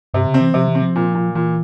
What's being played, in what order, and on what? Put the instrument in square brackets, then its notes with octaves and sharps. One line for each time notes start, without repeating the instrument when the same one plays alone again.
[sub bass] G2 [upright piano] C3
[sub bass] C#3
[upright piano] C4
[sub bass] E3
[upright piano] C3 [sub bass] F3
[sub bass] E3
[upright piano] C4
[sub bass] F3
[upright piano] A#2
A#2
[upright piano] A#2 [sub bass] E3